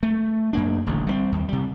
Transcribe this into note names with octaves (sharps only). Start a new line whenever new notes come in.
A3
F#2 A#3 D4
D#1 A1 D3
G3 G#3 C4
D#2
C3 G3